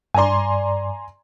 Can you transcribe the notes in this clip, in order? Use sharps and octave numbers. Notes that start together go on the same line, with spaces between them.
G2 D5 G#5 A#5 C6